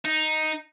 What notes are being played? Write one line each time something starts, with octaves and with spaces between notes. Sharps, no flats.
D#4